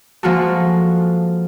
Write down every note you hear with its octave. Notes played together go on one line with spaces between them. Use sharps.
F3 G#3 A#3 F4 F#4 A4